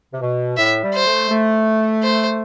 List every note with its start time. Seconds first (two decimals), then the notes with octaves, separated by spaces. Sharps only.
0.12 C3
0.21 B2
0.57 A2 E5
0.83 G3
0.94 C5
1.06 A3
1.30 A3
2.03 C5